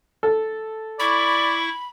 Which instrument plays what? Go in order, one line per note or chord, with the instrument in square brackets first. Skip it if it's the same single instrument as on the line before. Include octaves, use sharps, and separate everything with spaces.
[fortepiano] A4
[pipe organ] E4 C#6 [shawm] D5 [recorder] B5